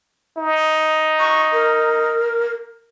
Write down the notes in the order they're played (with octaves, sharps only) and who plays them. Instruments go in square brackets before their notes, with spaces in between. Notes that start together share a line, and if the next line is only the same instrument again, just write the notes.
[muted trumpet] D#4
[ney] C#6
A#4